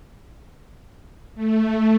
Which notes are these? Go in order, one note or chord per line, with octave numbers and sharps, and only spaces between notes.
A3